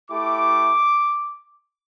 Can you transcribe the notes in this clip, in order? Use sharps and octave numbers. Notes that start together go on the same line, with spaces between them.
A3 E4 G4 D6